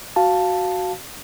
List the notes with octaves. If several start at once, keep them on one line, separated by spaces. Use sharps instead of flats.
F#4 F5 A5